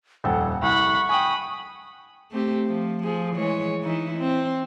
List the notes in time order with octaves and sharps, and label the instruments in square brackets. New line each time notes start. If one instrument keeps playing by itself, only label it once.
[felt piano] D#1 F2 A4 [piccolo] F#5
[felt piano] C2 [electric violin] F#5 B5 [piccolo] C#6
[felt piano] G5 G#5 [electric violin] B5 D#6
[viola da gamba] A3 C4 G4
F3
F3 G#4
E3 G#3 C#5
E3 D#4 E4
C4